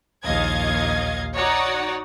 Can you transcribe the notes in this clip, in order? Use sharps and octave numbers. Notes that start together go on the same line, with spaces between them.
A#1 D#2 D#5 F5 G#6
D#4 F#4 C#5 D5 F#5